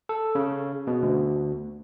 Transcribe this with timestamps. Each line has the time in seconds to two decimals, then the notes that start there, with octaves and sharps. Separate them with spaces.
0.09 A4
0.35 C#3
0.87 B2
1.02 D2